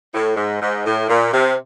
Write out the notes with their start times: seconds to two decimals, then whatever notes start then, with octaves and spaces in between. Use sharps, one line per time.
0.14 A2
0.37 G#2
0.61 G#2
0.85 A2
1.09 A#2
1.33 C3